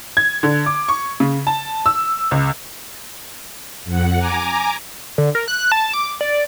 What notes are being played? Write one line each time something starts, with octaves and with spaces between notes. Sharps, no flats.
G#6
D3
D6
C#6
C#3
A5
E6
C#2
F2 F#5
G#5 A#5 D6
D3
A#4
F#6
A5
D6
D5